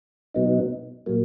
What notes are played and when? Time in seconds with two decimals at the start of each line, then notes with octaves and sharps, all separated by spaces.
0.34 B2 F#3 B3 D#4
1.06 A#2 F#3 A#3